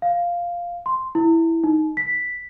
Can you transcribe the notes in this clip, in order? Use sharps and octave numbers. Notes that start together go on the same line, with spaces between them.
F5
C6
E4
D#4
B6